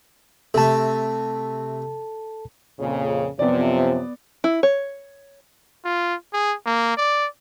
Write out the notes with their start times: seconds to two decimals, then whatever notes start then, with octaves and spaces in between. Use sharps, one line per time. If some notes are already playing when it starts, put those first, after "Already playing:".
0.54 C3 A3 A4 A5
2.80 F2 A#2 C#3
3.39 F#2 C3 F3 B3 D5
4.44 E4
4.63 C#5
5.85 F4
6.33 G#4
6.66 A#3
6.97 D5